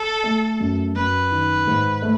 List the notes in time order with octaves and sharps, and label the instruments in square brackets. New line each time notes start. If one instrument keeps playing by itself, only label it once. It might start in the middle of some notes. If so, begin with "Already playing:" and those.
Already playing: [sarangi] A4
[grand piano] A3
F#2
[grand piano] F#2 [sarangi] B4
[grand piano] D#3
G#2
A3